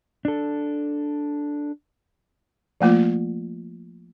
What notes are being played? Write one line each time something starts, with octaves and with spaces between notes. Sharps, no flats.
D4 A4
F3 A3 A#3 F4